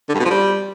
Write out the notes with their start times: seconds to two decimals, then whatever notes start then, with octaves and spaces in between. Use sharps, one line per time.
0.09 D3
0.14 G2
0.20 B2
0.25 F3
0.30 G3